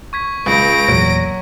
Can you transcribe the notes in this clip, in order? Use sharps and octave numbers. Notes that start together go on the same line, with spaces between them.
C#6 G#6 B6
C#2 A#6 D7
E2 A#2 F#3